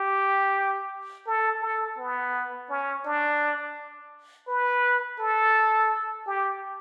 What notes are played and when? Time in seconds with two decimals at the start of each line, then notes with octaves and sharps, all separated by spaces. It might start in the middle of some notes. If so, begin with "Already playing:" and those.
Already playing: G4
1.27 A4
1.62 A4
1.98 B3
2.70 C#4
3.05 D4
4.48 B4
5.19 A4
6.27 G4